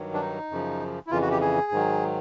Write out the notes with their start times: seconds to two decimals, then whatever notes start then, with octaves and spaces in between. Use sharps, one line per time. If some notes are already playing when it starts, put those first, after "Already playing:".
Already playing: G2 D#3 F#3
0.14 D4
0.21 D#4
0.51 F#2 C#3 F3
1.07 E4
1.11 F2 C#3 E3 F4
1.22 F#4
1.31 G4
1.41 G#4
1.72 G#2 D#3 F#3